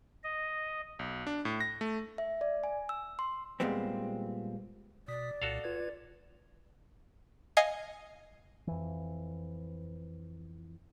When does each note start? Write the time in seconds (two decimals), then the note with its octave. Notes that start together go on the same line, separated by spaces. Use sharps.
0.24 D#5
0.99 B1
1.27 D4
1.45 A2
1.61 A#6
1.81 A3
2.18 E5
2.41 D5
2.64 G#5
2.89 E6
3.19 C6
3.60 A#2 G3 G#3 B3 C4
5.08 B2 D5 D#6 B6
5.42 C2 A#2 F#4 A4 F5
5.64 F4 B4 G#6
7.57 D#5 F5 G#5 G#6 C7 C#7
8.67 F2 E3